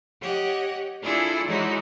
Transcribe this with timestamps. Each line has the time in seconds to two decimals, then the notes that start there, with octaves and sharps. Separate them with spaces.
0.21 G4 C#5 D#5 F#5
1.02 D4 E4 F4 G#4 A4 D5
1.48 E3 G#3 D#4 E4 F#4 C#5